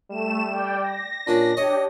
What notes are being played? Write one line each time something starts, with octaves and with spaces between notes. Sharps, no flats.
G3 A3 E7
D5 G5
A#6
A#2 C#4 D4
D4 G4 C#5 D#5